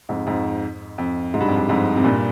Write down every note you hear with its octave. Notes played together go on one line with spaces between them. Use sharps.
F2 G#2
F2 G#2
F2
G#2
G2
F2
G2
F2 G#2
C3
G2 A#2